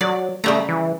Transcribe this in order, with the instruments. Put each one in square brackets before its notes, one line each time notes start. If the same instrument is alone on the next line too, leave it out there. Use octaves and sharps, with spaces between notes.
[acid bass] F#3 [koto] D5
[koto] C#3 G3 A#5 [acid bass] A3
[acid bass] E3